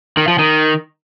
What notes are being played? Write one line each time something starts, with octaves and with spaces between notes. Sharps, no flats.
D#3
F3
D#3